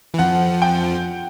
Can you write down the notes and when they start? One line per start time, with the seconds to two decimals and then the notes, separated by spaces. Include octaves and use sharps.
0.14 E3
0.18 F2 F3 F#5
0.62 G5